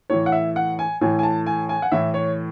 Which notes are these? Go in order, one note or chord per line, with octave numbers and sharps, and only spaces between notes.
A2 E3 C#5
F#5
E5
F#5
G#5
A2 E3 G#5
G#5
A5
G#5
G#5
F#5
A2 E3 E5
C#5